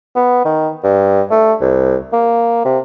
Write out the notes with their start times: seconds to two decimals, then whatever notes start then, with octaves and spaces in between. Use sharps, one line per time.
0.15 B3
0.45 D#3
0.84 G2
1.31 A3
1.61 C2
2.13 A#3
2.65 C3